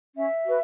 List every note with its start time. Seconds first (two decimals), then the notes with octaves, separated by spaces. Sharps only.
0.15 C#4 E5
0.44 F#4 B4